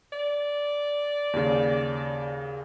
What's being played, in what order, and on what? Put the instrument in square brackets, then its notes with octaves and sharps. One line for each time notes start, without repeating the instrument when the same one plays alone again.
[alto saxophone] D5
[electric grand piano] D#2 C#3